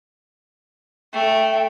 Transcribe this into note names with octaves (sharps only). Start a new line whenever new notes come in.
A3 G5